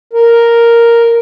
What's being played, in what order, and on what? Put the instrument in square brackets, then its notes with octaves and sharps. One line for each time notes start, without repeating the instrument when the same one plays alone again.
[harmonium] A#4